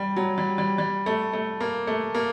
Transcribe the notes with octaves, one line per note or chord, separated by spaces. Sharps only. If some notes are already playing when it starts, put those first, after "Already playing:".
Already playing: G3
F#3
G3
G3
G3
A3
A3
A#3
A3
A#3